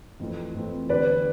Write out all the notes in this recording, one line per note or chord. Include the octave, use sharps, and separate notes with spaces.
F2 E3 A3 C4
F2 E3 A3 C4
E2 D3 G3 B4 D5